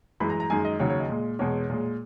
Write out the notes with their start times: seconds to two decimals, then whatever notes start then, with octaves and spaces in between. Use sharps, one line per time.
0.20 F#2 E3 G#3 B5
0.30 A#5
0.40 A#5
0.50 F#2 D#3 G#3 G#5
0.65 D#5
0.80 D#2 C#3 F#3 C#5
0.90 C#5
1.00 D#5
1.09 A#2 G#3
1.39 E2 B2 G#3 C#5
1.70 A#2 G#3